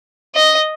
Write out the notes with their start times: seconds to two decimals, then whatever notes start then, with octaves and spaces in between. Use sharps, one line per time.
0.35 D#5